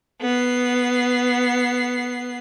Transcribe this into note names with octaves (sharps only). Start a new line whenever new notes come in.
B3 C7